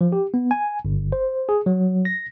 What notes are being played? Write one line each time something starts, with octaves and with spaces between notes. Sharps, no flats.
F3
G4
B3
G#5
G1
C5
G#4
F#3
A#6